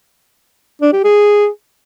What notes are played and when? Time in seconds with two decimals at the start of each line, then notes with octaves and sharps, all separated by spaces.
0.82 D4
0.93 G4
1.04 G#4